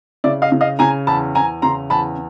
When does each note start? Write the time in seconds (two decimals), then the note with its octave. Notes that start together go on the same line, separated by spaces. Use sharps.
0.24 C#3 D5 E5
0.42 D#5 F5
0.52 C#3
0.61 D#5 F5
0.79 C#3 G#5 A#5
1.07 E2 A5 B5
1.35 E2 G#5 A#5
1.62 C#3 A#5 C6
1.90 E2 A5 B5